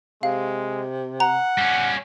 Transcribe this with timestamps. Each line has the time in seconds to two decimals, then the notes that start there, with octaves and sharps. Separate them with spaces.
0.23 C3 G#3 F5
1.20 F#5 A#5
1.58 G3 C#4